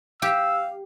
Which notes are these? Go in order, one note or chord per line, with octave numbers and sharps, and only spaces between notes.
G4 F5 E6